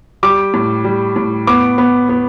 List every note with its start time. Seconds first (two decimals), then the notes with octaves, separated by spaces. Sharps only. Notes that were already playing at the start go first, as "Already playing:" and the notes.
0.23 G3 D6
0.54 A2
0.84 G3
1.16 A2
1.47 B3 D6
1.78 B3
2.09 B3